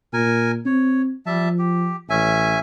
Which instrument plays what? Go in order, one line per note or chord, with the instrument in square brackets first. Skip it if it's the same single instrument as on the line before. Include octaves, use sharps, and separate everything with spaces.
[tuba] A#2 [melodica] A#4 G#5
[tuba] C4 [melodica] C#5
[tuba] F3 [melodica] G3 E5 A5
[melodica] G4
[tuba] A1 [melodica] C#4 E5 G#5